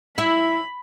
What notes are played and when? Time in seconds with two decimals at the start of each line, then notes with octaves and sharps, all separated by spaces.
0.18 E4 E5 B5